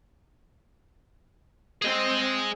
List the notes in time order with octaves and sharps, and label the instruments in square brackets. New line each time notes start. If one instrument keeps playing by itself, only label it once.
[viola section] C4 [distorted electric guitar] G#4 D#5